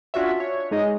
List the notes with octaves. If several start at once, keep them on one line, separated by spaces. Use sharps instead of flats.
C#4 D4 F4 F#4 C#5 E5
C#5
G#3 D#4 G#4 D#5